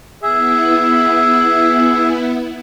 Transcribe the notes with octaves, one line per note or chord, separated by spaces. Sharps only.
B3 E4 G#4 E5